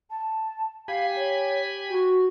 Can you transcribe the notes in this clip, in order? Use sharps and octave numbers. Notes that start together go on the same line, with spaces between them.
A5
G4 F5 G#5 B5
C#5
F#4